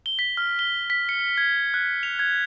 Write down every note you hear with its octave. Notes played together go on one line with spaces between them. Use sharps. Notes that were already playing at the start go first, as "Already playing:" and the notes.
G7
B6
F6
G7
B6
C#7
G#6
F#6
F7
G#6